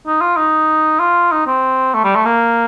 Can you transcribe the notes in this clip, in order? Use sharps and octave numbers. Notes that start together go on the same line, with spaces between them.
D#4
F4
D#4
F4
D#4
C4
A3
G3
A3
A#3